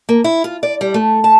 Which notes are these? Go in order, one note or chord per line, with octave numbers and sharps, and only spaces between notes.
A#3
E4
F4
D5
G3
A3
A5